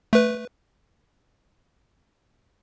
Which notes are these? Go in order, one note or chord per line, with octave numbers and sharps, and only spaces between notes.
A3 B4